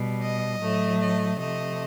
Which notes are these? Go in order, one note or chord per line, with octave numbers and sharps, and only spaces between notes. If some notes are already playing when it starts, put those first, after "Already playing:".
Already playing: B2 G3
D#5
A2 F#3 A3
D#5
C3 F3 A3 D#5